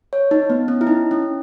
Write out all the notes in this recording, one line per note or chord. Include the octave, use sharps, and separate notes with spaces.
C#5
D#4
B3
C#4
E4
D#4
C#4